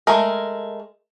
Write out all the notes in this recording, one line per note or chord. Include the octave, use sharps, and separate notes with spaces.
G#3 A3 A#4